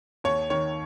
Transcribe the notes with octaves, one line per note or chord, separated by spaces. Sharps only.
D#2 C#5
D#3 C#5